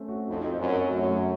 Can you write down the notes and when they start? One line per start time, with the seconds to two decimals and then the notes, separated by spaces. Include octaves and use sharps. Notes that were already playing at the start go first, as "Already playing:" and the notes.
Already playing: A3 C4 C#4
0.08 F#4
0.28 F2 D#4
0.49 C4
0.58 F#2
0.69 F#4
0.89 F#2 A3
1.09 F#3